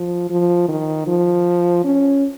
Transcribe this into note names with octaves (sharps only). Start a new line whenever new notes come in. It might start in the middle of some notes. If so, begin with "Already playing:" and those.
Already playing: F3
F3
D#3
F3
C#4